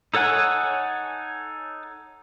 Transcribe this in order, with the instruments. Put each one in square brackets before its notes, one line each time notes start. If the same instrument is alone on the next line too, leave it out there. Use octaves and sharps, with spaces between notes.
[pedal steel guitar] D#4 A4 C#5 F#5 G#5